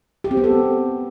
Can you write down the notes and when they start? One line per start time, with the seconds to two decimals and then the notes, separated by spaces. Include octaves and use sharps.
0.24 G4
0.31 C4
0.37 B3
0.44 A4